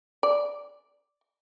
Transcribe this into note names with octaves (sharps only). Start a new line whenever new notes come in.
D5